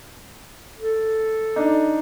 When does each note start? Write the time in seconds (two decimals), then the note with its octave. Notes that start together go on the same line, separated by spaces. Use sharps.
0.79 A4
1.56 D4 D#4